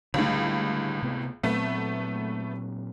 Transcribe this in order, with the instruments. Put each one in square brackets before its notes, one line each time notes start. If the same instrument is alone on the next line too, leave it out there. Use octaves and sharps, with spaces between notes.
[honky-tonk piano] C#2 A2 [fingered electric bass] D3 G3
[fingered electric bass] C3 A3 B3
[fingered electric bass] A#2 F#3 C4 [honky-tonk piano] A3 B3